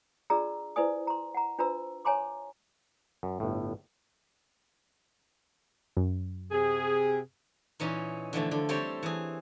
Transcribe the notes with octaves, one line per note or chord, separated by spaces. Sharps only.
D4 F4 G#4 D5 A#5 E6
E4 B4 C5 D5 G#5 D#6
A#5 C6
F#5 A#5
D4 F4 B4 C5 A#5 E6
C#5 G#5 A#5 C6 D6
F#2
G1 A2
F#2
C3 G#4
A#2 E3 C#4 D#4
D3 E3 F3 A3
D3
G3 C4 A4 C#5 G5
E3 G#4